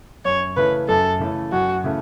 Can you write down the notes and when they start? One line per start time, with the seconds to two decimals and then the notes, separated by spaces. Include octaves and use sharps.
0.25 F#2 C#5
0.56 C#3 E3 A3 C#4 B4
0.88 F#2 A4
1.20 C#3 E3 A3 C#4
1.52 F#2 F#4
1.84 C#3 E3 A3